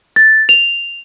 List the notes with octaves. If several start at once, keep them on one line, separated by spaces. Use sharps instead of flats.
A6
F7